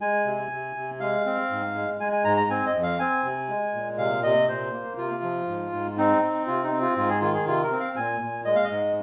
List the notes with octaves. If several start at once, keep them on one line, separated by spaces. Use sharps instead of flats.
G#3 G#5
C3
C3
C3
G#3 F5
C4
G#2
G#3
G#3 G#5
G#5
G#2 A#5
A#5
C4 G#5
D#5
F2
F5
C4 G#5
C3
G#3
A#2
C3 F5
C3 D#5
A#2 C5
A#3
C3 F4
F3
G#2
G#2
C4 D#4
C4
C3 F4
D#4
C4
F4
G#2 F4
G#4
D#3 F4
G#4
C3 F4
A#4
C4
F5
A#2 G#5
A#2
G#3 D#5
F5
D#5
G#2